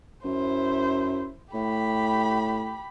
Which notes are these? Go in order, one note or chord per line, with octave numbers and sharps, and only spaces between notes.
F#2 E4 C5
A2 G4 B5